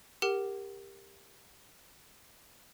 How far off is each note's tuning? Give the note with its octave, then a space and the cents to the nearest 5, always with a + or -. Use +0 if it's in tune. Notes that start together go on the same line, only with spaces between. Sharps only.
G4 +15 A#4 +0 F#5 +30